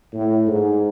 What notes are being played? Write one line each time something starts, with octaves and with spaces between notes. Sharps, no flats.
A2
G#2